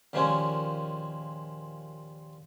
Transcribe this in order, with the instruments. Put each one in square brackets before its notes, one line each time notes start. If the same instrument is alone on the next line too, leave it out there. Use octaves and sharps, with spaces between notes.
[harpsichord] D#2 A#2 F3 G#3 C#4